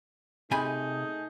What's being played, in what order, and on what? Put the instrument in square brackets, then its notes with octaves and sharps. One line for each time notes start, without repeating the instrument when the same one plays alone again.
[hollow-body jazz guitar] C3 G#5 B5 [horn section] A3 D#4 G#4